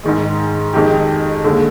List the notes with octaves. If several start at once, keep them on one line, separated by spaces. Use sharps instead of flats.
G#2 D#3 G#3
F2 D#3 G#3 D#4 G4
D#2 D3 G#3